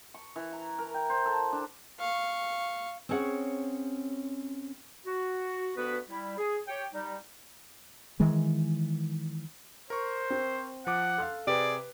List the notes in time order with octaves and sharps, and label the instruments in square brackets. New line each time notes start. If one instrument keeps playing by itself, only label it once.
[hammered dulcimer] C#6
E3
A#5
A#4
G5
C5
A4
D4
[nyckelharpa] F5 C#6
[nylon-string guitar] C4 C#4 G#4 C#5 F#5
[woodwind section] F#4
D2 G2 B3 F#4 B4
G3 E4
G#4
G4 C#5 G5
G3 D#4
[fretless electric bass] D#3 E3 G#3
[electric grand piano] A#4 C#6 [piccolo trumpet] C5
[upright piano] C4
[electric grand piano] F3 D6 [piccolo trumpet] F#5
[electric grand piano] A4 F5 [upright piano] C6 F#6
[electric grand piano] C3 [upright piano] G4 B4 [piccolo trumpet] G#4 [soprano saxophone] D5